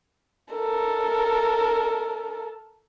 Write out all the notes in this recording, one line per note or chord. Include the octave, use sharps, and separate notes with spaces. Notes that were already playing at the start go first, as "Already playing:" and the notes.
A4 A#4